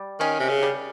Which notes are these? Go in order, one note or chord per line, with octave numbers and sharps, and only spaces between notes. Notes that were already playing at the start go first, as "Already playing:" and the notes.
Already playing: G3
D#3 C#4
C3
C#3
G3